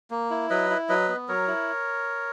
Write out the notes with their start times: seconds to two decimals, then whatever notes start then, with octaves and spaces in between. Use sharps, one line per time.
0.10 A#3
0.30 E4
0.50 F#3 B4 D#5
0.70 E4
0.89 F#3 B4 D#5
1.08 B3
1.29 F#3 A#4 C#5
1.47 E4